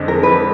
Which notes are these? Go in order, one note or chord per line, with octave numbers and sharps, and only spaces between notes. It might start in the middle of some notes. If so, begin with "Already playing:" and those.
Already playing: F2 D3 G#3 D4
A#4
B4